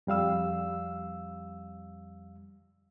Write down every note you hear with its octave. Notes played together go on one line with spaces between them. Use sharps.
F2 G3 F5 E6